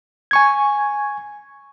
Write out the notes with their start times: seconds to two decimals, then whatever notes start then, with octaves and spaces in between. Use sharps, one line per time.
0.31 G#5 C#6 G#6